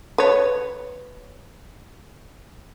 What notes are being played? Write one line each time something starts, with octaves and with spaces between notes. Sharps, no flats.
B4 C#5